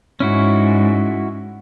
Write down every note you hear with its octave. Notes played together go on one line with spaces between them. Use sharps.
G#2 C#4 E4 F#4